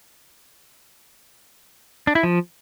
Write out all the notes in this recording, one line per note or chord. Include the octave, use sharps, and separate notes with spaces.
D4
E4
F3